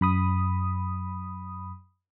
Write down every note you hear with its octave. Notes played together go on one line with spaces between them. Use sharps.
F#2 B5 D#6